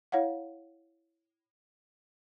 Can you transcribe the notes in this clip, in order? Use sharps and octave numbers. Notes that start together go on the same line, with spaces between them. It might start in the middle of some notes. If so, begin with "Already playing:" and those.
E4 C#5 F5 F#5